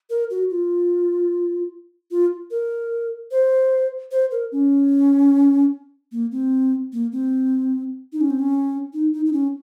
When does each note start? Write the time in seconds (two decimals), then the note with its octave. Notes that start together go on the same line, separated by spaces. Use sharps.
0.10 A#4
0.30 F#4
0.50 F4
2.11 F4
2.51 A#4
3.31 C5
4.11 C5
4.31 A#4
4.52 C#4
6.12 A#3
6.32 C4
6.93 A#3
7.12 C4
8.13 D#4
8.21 C#4
8.30 C4
8.39 C#4
8.94 D#4
9.13 D#4
9.26 D#4
9.33 C#4